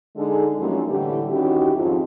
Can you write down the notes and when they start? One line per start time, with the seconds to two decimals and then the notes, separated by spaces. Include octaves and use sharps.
0.17 D3 G#3 D#4 G#4 A4
0.58 F#2 F3 G3 G#3 A#3 D#4
0.88 A2 D3 E3 G3 G4
1.31 D#3 C#4 E4 F#4 G4
1.75 F2 G#2 F3